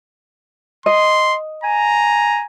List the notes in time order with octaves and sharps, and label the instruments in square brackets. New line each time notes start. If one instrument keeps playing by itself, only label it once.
[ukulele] D#5 [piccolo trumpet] C6
[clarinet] G#5 [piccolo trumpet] A#5